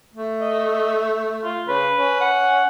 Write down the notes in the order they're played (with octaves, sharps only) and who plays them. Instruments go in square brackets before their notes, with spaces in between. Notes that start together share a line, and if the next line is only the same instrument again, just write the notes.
[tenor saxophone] A3
[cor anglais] D#5
F4
[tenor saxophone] C#3 [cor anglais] B4
[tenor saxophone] C#4
[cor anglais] F#5